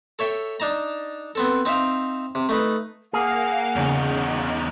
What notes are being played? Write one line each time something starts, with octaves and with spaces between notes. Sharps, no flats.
A4 C#5 E5 G5
D4 D#4 A5 A#5
B3 C4 A4
C4 D#4 C5 E5 F5
C3
A3 D#4 B4
A#3 G#4 F5 F#5
E2 C#3 D#4